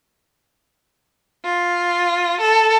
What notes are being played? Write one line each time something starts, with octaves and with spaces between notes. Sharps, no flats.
F4
A4